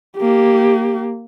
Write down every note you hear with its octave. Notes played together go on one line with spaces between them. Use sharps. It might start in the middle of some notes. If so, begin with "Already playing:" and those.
A#3 G4